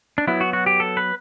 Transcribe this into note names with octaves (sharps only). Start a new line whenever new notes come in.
D4
F#3 B3 E4
F#4
F#4
G4
A4
B4